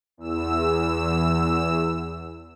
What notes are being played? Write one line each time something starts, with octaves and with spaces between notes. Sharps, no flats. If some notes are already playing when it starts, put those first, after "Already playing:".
E2 E6